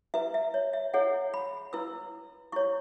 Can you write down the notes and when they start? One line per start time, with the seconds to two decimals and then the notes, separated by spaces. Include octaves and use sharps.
0.14 E4 B4 E5
0.34 E5
0.54 C#5
0.73 E5
0.94 E4 G#4 C#5 F#5
1.34 B5
1.73 E4 B4 E6
2.52 E4 C#5 C#6